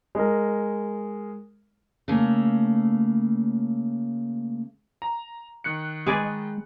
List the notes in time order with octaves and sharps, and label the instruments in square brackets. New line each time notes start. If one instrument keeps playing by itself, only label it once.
[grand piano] G#3 A#4
[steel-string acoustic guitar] C#3 A3 A#3
[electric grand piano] A#5
D#3 F#6 C#7
[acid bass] G#3 [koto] G#4 B4 D5